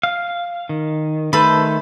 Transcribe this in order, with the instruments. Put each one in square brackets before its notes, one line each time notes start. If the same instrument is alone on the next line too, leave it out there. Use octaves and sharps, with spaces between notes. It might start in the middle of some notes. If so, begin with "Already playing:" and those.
[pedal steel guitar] F5
D#3
[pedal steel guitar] D#3 A3 C5 [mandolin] A4 B4